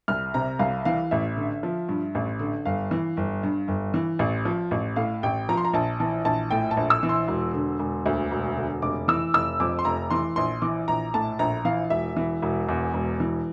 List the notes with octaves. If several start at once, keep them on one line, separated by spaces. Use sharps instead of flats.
C2 F6
C3 A#5
C2 F5
E3 F5
A1 E5
D3
F3
G2
A1
D3
G1 F5
E3
G1
G2
G1
E3
A1
F3
A1
A2 F5
A1 G5
F3 A#5
C6
A#5
A#1 A5
E3 A5
A#1 A5
A2 G5
A5
A#1
E6
E3
C6
E1
D3
E1
D2
E1
D3
F1 D6
E3 E6
F1 E6
F2 D6
C6
F1 A#5
E3 C6
A#1 C6
E3 D6
A#1 A#5
A2 A5
A#1 A#5
E3 F5
E1 E5
E3
E1
E2
E1
E3